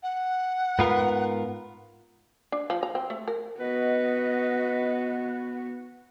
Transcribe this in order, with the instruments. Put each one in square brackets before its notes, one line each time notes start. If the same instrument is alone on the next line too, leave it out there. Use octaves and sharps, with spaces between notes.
[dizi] F#5
[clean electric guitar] G#2 F4 A#4 [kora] B3 B4
[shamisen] D4
F3
A#5
C4
A3
A#4
[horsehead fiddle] B3 F#4 [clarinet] B4 [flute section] D#5